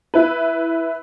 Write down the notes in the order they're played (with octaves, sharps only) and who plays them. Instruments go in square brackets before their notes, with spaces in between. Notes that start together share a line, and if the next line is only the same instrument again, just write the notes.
[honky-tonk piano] E4 B4